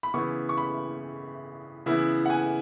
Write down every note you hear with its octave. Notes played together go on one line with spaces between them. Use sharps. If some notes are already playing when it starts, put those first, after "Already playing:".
B5
C#3 E3 B3 E4 C#6
C#6
B5
C#3 E3 B3 E4
F#5
G#5